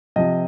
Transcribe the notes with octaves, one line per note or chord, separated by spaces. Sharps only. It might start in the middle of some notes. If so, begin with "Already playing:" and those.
C3 F3 D#5